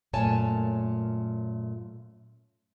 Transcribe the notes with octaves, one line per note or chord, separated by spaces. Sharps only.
F#2 A#2 A3 C#5 G#5 A5